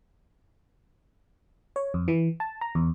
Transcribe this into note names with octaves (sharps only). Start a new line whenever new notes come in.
C#5
F2
E3
A5
A#5
E2